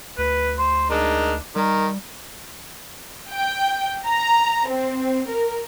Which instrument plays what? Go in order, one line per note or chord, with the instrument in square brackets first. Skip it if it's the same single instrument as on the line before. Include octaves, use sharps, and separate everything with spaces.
[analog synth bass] D2 [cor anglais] B4
[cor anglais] C5
[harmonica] G#3 D#4 A#4 [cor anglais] D4
[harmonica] D#3 [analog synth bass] G3 [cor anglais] A#4
[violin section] G5
A#5
C4
A#4